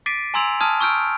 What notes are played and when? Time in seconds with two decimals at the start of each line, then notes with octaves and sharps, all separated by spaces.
0.06 D6 A6 B6 C7 D7 D#7
0.34 G#5 A#5 C6 E6 G#6 F7
0.61 A5 D#6 F6 G#6
0.81 C#6 E6 F6 G6 D7